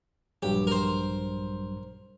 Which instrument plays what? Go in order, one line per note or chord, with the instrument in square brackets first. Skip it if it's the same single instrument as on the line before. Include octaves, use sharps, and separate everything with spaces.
[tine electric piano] A#1 G2 F#3 [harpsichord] G4
[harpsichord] A#4 C5